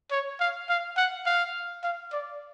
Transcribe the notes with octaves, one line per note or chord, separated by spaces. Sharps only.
C#5
F5
F5
F#5
F5
F5
D5